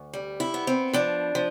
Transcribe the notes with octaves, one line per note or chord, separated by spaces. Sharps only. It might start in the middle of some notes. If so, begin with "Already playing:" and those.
Already playing: D2
G3
E4
B3
C4
F3 D4
F3